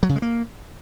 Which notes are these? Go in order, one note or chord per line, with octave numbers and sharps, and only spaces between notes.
F#3
C#3
G#3
A#3